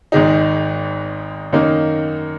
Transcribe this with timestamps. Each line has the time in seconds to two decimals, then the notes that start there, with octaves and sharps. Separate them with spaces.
0.12 G#1 G#2 D#3 G#3 D#4
1.53 F#2 D#3 A#3 D#4